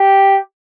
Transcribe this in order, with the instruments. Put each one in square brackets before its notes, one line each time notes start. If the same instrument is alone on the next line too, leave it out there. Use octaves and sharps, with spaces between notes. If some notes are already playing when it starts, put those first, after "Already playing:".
Already playing: [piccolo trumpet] G4